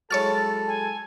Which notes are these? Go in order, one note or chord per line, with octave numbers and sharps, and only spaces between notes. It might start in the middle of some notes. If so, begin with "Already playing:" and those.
F#3 G#3 E4 A4 C#5 C#6 F6 A6
G#5